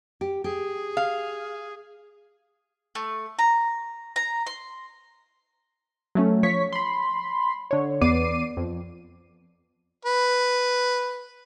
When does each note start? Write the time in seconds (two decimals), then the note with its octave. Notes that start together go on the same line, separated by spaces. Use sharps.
0.21 G4
0.44 G4 G#4
0.97 F5
2.95 A3
3.39 A#5
4.16 A#5
4.47 C6
6.15 F#3 A3 C#4
6.43 F3 C#5 C#6 B6
6.73 B5 C6
7.71 D3 C#5
8.01 E2 B3 D5 D6 C7 D#7
8.57 F2
10.05 B4